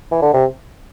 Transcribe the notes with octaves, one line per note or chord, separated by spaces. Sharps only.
E3
D3
C3